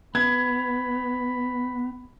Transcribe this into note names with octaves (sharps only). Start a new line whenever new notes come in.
B3 B5 G#6